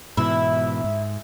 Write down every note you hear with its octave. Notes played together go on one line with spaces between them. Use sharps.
G#2 B2 E3 E4
G#2